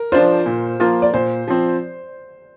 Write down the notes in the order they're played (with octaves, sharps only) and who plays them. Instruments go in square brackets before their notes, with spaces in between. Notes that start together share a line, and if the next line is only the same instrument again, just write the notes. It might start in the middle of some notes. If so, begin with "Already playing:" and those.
Already playing: [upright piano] A#4
[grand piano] F3 D4 F4 [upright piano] C5
[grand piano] A#2
F3 A#3 F4
[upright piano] D5
[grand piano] A#2 [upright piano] C5
[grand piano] F3 C4